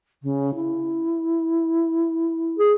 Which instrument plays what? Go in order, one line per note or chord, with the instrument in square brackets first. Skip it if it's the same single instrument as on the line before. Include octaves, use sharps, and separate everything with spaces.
[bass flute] C#3
E4
[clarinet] G#4